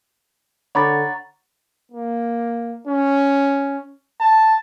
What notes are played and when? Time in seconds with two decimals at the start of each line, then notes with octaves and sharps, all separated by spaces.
0.75 D3 C#5 F#5 A#5 B5 D6 A6
1.92 A#3
2.87 C#4
4.20 A5